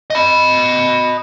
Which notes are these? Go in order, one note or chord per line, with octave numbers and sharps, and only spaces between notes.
D#5 B5